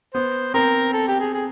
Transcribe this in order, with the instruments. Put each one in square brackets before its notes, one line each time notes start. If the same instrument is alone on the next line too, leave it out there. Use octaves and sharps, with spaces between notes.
[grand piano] B3 [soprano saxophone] C5
[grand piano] C4 [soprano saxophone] A#4
[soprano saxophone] A4
G4
G#4
G#4